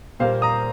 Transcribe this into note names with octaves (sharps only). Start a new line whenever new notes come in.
A#2 G3 A#3 C5 F5
A#5 D#6